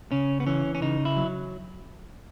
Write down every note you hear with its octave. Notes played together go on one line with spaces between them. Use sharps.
C#3 C#4
B3
E3 C#4
C#4
C#3 D#4
E4
F#3